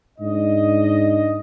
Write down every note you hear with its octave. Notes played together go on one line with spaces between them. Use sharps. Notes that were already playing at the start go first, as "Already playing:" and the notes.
G#2 D4 D#5